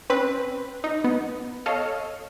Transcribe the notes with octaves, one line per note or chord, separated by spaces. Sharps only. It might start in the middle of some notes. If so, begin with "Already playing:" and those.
C4 C#4 B4
D#4
B3
A4 C#5 D#5 F5